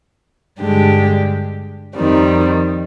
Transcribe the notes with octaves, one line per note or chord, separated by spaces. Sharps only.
G2 D3 G#3 D4 G4
F2 D#3 G3 C4